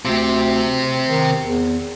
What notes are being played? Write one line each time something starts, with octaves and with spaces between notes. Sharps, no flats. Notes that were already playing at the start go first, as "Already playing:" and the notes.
D2 C3 G4
D#3
E2